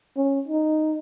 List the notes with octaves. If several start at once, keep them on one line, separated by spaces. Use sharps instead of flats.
C#4
D#4